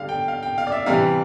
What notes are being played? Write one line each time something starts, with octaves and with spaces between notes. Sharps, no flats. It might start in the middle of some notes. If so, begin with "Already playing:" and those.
Already playing: D3 G3 F5
G5
F5
G5
F5
D5
E5
C3 E3 G3 F5